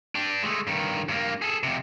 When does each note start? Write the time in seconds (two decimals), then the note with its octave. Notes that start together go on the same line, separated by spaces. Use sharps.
0.15 D4 G4
0.43 G#3 A3
0.67 G2 D#3
1.09 G2 A#3
1.42 G#4 A4
1.63 F2 C3